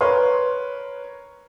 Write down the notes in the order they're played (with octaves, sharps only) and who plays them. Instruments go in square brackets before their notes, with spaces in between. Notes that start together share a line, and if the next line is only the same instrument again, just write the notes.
[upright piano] A#4 B4 C#5 C6